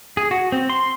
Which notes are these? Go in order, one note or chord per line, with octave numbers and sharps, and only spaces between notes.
G#4
F#4
C4
C6